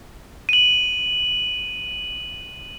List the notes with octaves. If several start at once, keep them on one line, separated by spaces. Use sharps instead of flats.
D#7 F#7